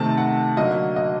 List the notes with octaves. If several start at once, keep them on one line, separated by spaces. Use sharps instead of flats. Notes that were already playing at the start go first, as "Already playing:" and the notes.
Already playing: C3 D#3 A3 C4 A5
F#5
D3 F#3 A#3 D#5
D#5